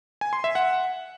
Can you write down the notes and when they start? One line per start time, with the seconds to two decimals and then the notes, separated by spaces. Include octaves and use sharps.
0.21 G#5
0.33 C6
0.44 E5
0.55 F#5